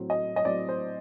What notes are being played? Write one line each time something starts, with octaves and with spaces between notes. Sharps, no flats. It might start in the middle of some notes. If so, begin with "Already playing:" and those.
Already playing: A2 F#3 C4
D#5
D#5
A2 F#3 C4 D5
C5